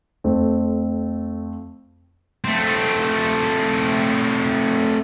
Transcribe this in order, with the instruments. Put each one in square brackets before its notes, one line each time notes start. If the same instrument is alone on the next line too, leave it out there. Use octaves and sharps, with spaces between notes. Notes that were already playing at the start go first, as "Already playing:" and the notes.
[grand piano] F2 A3 C4
[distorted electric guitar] A3 C4